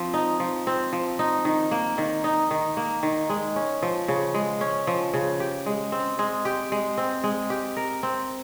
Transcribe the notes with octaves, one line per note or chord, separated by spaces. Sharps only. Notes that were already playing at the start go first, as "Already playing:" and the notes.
Already playing: F3 C4
D#4
F3
C4
F3
D#4
D#3
A#3
D#3
D#4
D#3
A#3
D#3
G#3
C#4
F3
C#3
G#3
C#4
F3
C#3
G4
G#3
C4
G#3
G4
G#3
C4
G#3
G4
A#4
C4